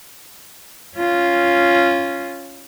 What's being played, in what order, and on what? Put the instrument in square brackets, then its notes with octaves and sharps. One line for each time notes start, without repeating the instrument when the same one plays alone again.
[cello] C#4 F4